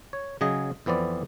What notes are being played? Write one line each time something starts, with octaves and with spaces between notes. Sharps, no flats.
C#5
C#3 F#3 G#4 D#5
F2 E3 B3 C4 D5